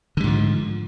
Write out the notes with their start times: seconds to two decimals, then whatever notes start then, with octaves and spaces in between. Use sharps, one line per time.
0.17 D3
0.20 G3
0.24 G#2
0.27 F3